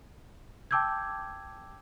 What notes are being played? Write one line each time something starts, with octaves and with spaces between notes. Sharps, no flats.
G5 A5 D6 E6 G6 G#6